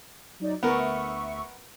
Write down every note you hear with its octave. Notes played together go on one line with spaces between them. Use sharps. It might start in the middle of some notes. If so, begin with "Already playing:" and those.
F#3 D#4 D5
D2 B3 A#4 E5 C#6